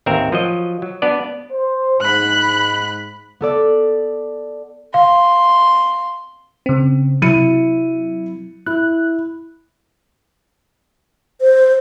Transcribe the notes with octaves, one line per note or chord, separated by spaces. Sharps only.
A1 D#2 C4 A#4 E5
F3 F#3 D#5
F#3
B3 D4 D5
C5
G#2 B5 F#6
B3 A4 D5
F5 C6
C#3 C4
C3 F#3 E4 C#7 D#7
E4 F#6
C5